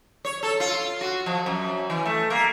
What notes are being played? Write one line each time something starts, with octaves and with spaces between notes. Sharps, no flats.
C#5
A4
F4
F#4
F3
F#2
E3
A3
A#3